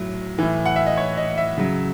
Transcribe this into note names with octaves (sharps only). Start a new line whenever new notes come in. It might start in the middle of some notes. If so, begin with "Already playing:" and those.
Already playing: A2 F#3
A2 E3
F#5
E5
D#5
C#5
D#5
E5
C#3 F#3